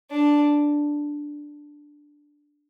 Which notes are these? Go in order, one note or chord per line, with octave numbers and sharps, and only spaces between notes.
D4